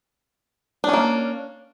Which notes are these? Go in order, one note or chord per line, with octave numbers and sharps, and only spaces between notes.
A#3 C#4 D4